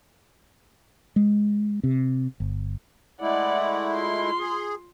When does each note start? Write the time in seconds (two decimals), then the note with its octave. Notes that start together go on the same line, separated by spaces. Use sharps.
1.16 G#3
1.83 C3
2.40 G1
3.21 G#3 A3 E4 D5 F#5
3.93 F4 C6
4.39 G#4